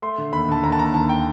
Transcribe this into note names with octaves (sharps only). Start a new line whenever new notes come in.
A3 C6
D3
D#2 B5
D3 A5
D#2 A#5
A5
D#2 A#5
D#2 A5
G5